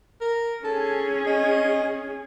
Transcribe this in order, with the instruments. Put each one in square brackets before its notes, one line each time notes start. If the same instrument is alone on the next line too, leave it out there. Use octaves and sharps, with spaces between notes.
[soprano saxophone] A#4
[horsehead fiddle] C#4 G#4 [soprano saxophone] A4
[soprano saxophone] D#5